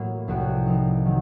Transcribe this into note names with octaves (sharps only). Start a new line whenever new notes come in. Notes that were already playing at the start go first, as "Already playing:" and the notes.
Already playing: A2 F#3 A#3
C2 C3 F3 C4 F#4
F3 C4 D#4
D#3 F#3